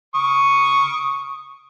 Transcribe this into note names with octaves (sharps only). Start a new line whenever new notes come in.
C#6 D#6